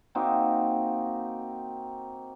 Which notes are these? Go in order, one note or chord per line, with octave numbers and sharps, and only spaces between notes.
A#3 C4 D#4 F#4